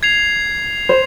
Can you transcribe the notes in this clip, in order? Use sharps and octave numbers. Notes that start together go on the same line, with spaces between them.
G#6 C7 F7
C5